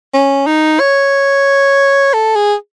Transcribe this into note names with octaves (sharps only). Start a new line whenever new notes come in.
C#4
D#4
C#5
A4
G#4